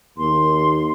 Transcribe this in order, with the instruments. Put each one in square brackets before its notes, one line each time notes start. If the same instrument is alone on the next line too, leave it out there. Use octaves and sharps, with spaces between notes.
[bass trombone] D#2 [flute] C6